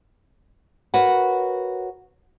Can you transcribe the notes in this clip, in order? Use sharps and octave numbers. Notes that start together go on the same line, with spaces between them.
F#4 A#4 B4 C#5 F#5